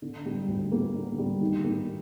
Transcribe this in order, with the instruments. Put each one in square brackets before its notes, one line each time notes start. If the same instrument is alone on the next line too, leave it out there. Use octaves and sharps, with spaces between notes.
[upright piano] D3
G3
D2
A#3
D3
G3
D#3
A#3